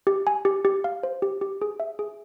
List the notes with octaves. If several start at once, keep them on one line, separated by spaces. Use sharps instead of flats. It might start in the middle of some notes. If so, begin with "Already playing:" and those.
G4
G#5
G4
G4
F5
C5
G4
G4
G#4
E5
G#4